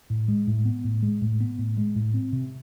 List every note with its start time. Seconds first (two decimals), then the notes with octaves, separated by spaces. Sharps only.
0.10 A2
0.28 G#3
0.47 A2
0.65 B3
0.84 A2
1.02 G#3
1.21 A2
1.40 B3
1.58 A2
1.77 G#3
1.96 A2
2.14 C4
2.32 C3